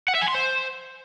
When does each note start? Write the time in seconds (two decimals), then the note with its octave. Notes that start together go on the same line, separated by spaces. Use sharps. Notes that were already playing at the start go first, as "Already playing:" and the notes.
0.08 F#5
0.15 E5
0.22 G#5
0.28 C6
0.35 C5